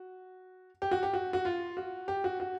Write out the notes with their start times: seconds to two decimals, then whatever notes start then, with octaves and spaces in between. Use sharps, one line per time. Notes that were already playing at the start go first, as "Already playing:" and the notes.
Already playing: F#4
0.82 G4
0.91 F#4
1.03 G4
1.14 F#4
1.33 F#4
1.45 F4
1.77 F#4
2.08 G4
2.24 F#4
2.40 F#4